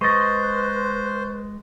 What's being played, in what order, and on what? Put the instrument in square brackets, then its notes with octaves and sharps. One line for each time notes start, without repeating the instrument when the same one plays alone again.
[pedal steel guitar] G#3 D#5 [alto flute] B4 [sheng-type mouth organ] C5 [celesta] C#6 A6